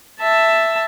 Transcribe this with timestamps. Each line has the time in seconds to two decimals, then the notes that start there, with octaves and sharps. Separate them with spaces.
0.20 E5 A5